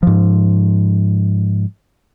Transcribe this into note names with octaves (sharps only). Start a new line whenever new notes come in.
G#2 F3